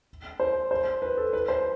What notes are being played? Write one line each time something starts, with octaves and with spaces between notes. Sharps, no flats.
C5
C5
B4
A4
B4
C5